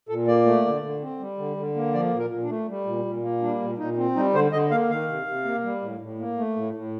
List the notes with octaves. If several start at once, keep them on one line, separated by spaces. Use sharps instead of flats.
A#2 A4
A#3 D5
A3
D3
D3
C4
G3
D3
D3
A#3
F3 D5
A#2
A#4
A#2
D4
A3
G3
A#2
A#2
A#3
G3 D4
A#2
A#2 D#4
C4
G3 D#4
D3 C5
D3 D#5
A#3 F5
D#3 F5
C3
C3
A#3
G3
A2
A2
A#3
A3
A2
A2